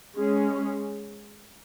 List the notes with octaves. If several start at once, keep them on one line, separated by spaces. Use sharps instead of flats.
G#3 C#4 G#4